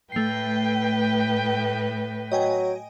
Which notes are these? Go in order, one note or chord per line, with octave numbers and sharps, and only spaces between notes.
A2 A3 B4 G5 C7
F#3 D#5 G5 G#5